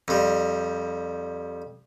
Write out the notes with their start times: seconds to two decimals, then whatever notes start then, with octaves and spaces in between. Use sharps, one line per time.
0.08 F2 G3